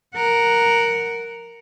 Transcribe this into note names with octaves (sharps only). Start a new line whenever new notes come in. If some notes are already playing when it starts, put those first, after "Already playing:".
A#4 F#5